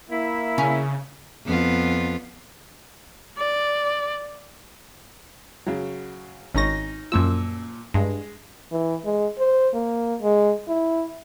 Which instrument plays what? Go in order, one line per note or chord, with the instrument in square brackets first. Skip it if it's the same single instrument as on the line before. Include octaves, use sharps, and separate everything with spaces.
[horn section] A#3 E4
[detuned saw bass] C#3 [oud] C#4
[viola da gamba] F2 B3 F4
[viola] D5
[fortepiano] C#3 F#3
[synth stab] G#1 A#6 [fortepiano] C#4 D#4 C#6
[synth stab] F#2 E6 [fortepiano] A#2 F3
[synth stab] G2 [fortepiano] G#3
[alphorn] E3
G#3
C5
A#3
G#3
E4